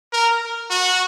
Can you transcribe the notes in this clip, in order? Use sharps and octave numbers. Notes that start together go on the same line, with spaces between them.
A#4
F#4